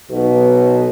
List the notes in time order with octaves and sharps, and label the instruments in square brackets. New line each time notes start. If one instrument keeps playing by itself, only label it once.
[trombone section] B1 B2